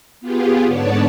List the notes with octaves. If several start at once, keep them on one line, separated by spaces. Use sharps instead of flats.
B3 F4 G4 G#4
G#2 D3 B3 C#5 D5 A5